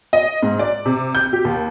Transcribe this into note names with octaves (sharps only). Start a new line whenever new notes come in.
D#5
G#2
D5
C3
G6
G4
D#2